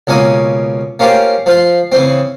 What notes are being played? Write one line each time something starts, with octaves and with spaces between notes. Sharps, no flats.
C#2 B2 A#3 C#4 D#6
A#3 C#4 F4 G4 C5
F3 F4 C6
C#3 E3 C4